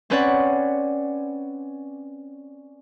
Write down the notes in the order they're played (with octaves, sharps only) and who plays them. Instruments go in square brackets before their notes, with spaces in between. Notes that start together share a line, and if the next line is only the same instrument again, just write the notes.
[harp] C4 C#4 B4 C#5 D5 F#5